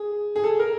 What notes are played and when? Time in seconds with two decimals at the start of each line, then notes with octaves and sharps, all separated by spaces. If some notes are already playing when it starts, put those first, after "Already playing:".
Already playing: G#4
0.36 G#4
0.44 A4
0.59 A#4